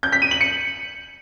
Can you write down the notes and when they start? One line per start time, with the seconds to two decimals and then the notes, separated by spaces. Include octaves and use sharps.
0.03 G6
0.12 B6
0.22 D#7
0.31 F#7
0.41 C#7